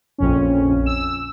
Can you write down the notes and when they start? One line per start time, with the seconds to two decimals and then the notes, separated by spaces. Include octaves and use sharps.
0.18 A#1 F2 C#4
0.86 E6